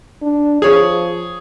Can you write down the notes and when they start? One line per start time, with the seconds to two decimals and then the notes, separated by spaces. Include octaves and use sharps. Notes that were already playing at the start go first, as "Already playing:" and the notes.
0.22 D4
0.62 F3 G#4 C#5